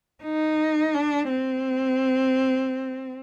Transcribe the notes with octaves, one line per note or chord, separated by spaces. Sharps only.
D#4
D4
C4